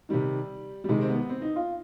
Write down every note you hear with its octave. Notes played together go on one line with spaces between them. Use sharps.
C3 D#3 G3
G3
C3 D#3 G#3
C4
B3
C4
D#4
F4